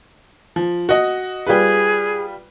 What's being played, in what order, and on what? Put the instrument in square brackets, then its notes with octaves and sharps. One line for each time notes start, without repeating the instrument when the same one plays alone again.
[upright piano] F3
F#4 D#5
[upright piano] G3 F4 B4 [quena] G#4